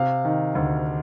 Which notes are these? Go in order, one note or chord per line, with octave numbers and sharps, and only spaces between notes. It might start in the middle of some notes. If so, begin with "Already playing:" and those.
Already playing: C3 F5
D#3
D2